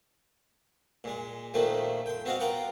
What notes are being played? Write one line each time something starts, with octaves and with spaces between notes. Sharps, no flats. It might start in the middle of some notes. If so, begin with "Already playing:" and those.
A#2 G#3
A#1 A#2 D#3 F3 A3 A#3
G5 C6
B3 C4 F#4 D#5 F5
F4 A#4 D5 F#5 G5